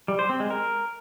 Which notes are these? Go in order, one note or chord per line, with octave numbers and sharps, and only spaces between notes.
G3
C5
C4
G#3
A#4